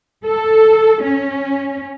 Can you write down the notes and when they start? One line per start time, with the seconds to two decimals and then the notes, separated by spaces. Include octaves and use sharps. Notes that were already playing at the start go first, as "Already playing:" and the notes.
0.25 A4
1.03 C#4